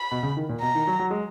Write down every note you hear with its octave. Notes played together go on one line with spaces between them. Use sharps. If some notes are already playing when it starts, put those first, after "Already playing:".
Already playing: B5
B2
C#3
D#3
A#2
B2 A#5
D#3
F#3
F#3
G#3